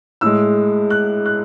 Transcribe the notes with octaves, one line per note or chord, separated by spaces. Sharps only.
A2 G#3 E6
F#6
F#6